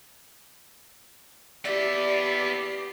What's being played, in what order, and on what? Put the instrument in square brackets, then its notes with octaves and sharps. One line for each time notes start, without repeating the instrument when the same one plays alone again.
[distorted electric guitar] B3 E5 [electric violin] G4 C7 [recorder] D5